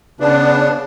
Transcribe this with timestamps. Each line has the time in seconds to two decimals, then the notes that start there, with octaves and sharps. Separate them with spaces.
0.20 C#3 B3 D4